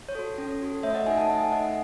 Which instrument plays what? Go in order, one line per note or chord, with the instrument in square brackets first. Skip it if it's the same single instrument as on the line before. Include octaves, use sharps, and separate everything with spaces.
[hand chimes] C#5
F#4 A4
C#4
F#4 A4
A3 C#5 E5
D#5 F#5
D#4 A4 E5 G#5
F#5 A5
A3 E5 G#5
D#4 A4 D#5 F#5